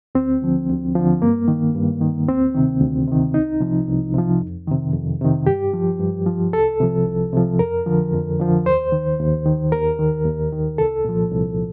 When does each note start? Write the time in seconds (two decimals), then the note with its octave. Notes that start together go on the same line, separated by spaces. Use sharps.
0.15 D2 C4
0.42 D3 F3
0.69 D2
0.95 D3 F3
1.22 G2 A#3
1.48 D#3
1.75 G2
2.01 D#3
2.28 D2 C4
2.55 C3 D#3
2.81 D2
3.08 C3 D#3
3.34 C2 D#4
3.61 C3 F3
3.88 C2
4.14 C3 F3
4.40 F2
4.67 C3 D#3
4.93 F2
5.21 C3 D#3
5.47 G2 G4
5.73 F3
5.99 G2
6.27 F3
6.53 C2 A4
6.80 C3 F3
7.06 C2
7.33 C3 F3
7.59 F2 A#4
7.86 D3 F3
8.13 F2
8.39 D3 F3
8.66 D#2 C5
8.92 D#3
9.19 D#2
9.46 D#3
9.72 D#2 A#4
9.99 D#3
10.26 D#2
10.52 D#3
10.78 C2 A4
11.05 A#2 F3
11.32 C2